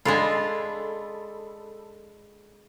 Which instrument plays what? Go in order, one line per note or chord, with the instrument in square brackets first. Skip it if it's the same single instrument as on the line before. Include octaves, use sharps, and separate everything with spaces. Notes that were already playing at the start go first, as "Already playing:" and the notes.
[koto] G#3 D4 F4 [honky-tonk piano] A4 B5